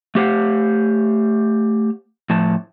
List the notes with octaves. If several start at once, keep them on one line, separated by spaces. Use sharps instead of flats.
A3 G4 C5 F5 F#5
A2 F3 A5